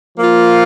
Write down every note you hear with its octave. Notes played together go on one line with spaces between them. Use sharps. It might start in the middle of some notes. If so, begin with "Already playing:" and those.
F3 A#3 F4